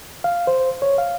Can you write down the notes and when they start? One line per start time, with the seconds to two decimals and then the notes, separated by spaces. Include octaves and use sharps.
0.24 F5
0.47 C5
0.82 C#5
0.98 F5